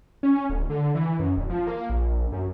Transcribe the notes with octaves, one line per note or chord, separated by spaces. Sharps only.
C#4
D1
D3
E3
F#2
E1
F3
A#3
A#1
F#2